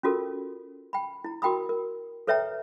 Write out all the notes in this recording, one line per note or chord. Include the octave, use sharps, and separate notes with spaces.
C#4 F4 F#4 A4 A#4
G5 B5
E4 A#5
F#4 A#4 G5 A#5 B5 D#6
A#4
A4 B4 C#5 E5 G5 A#5